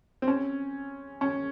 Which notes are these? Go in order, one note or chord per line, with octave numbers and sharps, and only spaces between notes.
C4
C#4
C#4